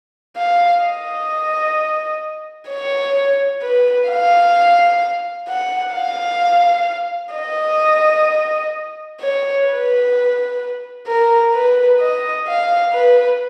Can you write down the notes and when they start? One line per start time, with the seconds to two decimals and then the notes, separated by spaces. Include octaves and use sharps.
0.37 F5
0.83 D#5
2.70 C#5
3.62 B4
4.09 F5
5.48 F#5
5.95 F5
7.34 D#5
9.21 C#5
9.67 B4
11.07 A#4
11.54 B4
12.00 D#5
12.48 F5
12.94 B4